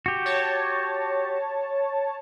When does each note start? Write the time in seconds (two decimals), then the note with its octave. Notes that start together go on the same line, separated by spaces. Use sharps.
0.06 F#4 G4
0.26 C#5 A5